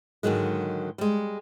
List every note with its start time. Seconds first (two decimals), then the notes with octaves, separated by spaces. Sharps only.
0.23 G#2 D3 D#3 F#3 G#3
0.98 G3 G#3